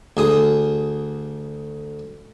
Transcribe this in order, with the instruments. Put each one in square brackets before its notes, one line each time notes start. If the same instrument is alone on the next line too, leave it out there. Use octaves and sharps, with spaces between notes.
[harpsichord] D2 G#4 D#6